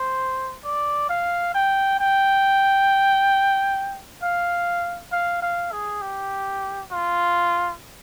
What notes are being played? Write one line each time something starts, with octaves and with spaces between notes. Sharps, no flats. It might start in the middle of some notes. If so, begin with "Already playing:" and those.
Already playing: C5
D5
F5
G5
G5
F5
F5
F5
G#4
G4
F4